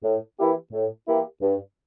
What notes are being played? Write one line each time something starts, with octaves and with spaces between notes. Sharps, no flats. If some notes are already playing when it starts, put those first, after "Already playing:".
A2
E3 A#3 E4 G4
A2
E3 A#3 E4 G4
G2